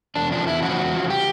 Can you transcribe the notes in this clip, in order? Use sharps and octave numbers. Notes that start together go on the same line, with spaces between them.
E2 D4
C#3 F3 D4
E2 E4
C#3 F3 F#4
E2
C#3 F3
G4